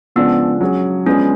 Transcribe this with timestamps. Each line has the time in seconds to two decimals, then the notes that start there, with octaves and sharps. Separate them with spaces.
0.16 C#3 F3 G#3 B3 D4
0.61 F#3 C#4 G#4
1.06 F3 G#3 B3 C#4 D4